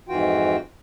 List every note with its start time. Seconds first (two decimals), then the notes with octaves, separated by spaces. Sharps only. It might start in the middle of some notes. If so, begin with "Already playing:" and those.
0.09 F2 G#2 E3 F4 F#4 G5